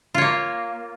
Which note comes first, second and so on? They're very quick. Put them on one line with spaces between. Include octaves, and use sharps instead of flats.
F4 C#5 A#3